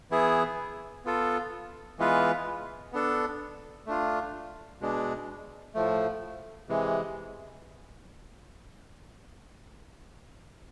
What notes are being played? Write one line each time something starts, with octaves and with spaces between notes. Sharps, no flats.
E3 B3 E4 G#4
B3 F4 A4
E3 G#3 B3 F4 B4
B3 D4 A4
A3 D4 F4
B2 G#3 D4
A2 F3 A3
C3 E3 G#3